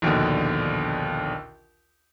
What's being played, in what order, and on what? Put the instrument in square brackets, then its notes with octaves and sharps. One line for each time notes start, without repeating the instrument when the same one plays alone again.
[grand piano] A#1 D#2 B2 D3